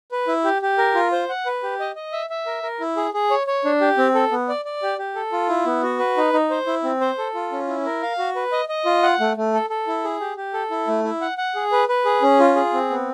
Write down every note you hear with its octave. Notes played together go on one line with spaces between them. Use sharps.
B4
E4
G4
G4
A#4
F4
C5
F#5
B4
G4
D#5
D#5
E5
E5
A#4
A#4
E4
G#4
G#4
C#5
C#5
D4
G4
C4
A4
B3
D5
D5
G4
G4
A4
F4
E4
B3
F#4
B4
D#4
D#4
C5
E4
C4
C5
A4
F4
C#4
E4
A#4
F5
F#4
B4
D#5
D#5
F4
F#5
A3
A3
A4
A4
E4
G#4
G4
G4
A4
E4
A3
E4
F#5
F#5
G#4
B4
B4
G#4
C#4
F4
G#4
C4
B3